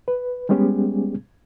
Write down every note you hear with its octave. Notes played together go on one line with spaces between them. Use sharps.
B4
G3 G#3 B3 C#4 G4 G#4